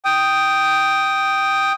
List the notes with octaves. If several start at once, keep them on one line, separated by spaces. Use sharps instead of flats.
G5 D#6